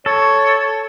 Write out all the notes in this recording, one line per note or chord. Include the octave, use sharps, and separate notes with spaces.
A4 C#5